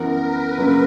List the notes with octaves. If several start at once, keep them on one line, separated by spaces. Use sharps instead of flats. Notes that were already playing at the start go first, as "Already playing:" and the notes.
Already playing: F#2 E3 B3 A#4
B4
F#2 C#3 F#3 A#3